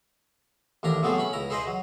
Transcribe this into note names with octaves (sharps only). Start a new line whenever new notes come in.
A1 D#2 D4 A#5
C3 F3 F#3 A3 B3 G#4
C#4 B5
C#2 E4 A#5
E4 G#4 B4 C5 D#5
F#3